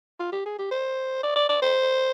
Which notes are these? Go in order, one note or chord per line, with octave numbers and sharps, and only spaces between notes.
F4
G4
G#4
G4
C5
D5
D5
D5
C5